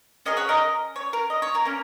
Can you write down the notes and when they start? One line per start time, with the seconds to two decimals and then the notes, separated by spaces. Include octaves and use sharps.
0.26 C#4 G#4 A#4 D#5
0.37 C#5 F#5
0.49 A#4 D#5
0.96 C#5
1.13 A#4
1.30 D#5
1.42 C#5
1.55 A#4
1.65 A#3 C#4